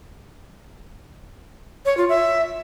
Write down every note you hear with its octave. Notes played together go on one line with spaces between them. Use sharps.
C#5
F4
E5